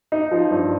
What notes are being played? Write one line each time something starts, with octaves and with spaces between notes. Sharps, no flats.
D#4
F3
G2